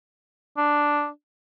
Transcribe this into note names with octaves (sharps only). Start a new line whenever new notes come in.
D4